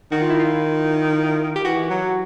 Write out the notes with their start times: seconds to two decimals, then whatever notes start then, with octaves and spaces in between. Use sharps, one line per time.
0.12 D#3 F#4
0.21 F4
0.30 E4
0.40 F4
1.56 G4
1.65 E3 F#4
1.90 F#3